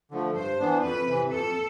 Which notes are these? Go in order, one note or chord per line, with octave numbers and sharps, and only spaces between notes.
D3 F3 A3
G2 C5
E3 B3 D4
F2 B4
C3 E3
F2 A4